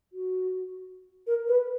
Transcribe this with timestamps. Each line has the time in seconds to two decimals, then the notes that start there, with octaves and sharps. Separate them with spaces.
0.13 F#4
1.27 A#4
1.48 B4